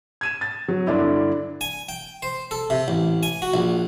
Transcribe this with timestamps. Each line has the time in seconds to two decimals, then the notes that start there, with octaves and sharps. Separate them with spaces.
0.21 G#6 D#7 E7
0.41 A6
0.68 F#3
0.87 G2 D3 D4 E4
1.61 G#5
1.89 G5
2.23 C5
2.51 A4
2.70 C3
2.88 A1
3.23 G#5
3.42 F#4
3.54 A#1